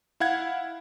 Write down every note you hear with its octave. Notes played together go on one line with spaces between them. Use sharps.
E4 F5 F#5 G#6